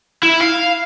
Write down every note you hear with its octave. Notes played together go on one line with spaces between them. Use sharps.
E4
F5